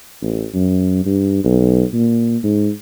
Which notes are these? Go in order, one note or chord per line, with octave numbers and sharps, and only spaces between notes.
A1
F#2
G2
B1
A#2
G#2